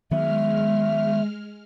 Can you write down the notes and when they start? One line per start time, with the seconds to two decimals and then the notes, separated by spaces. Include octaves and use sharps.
0.11 D#3 F#3 G#3 B3 E5 F6